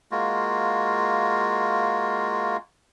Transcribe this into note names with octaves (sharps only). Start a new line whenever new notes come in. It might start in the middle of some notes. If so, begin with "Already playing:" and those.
G#3 A#3 F4 F#4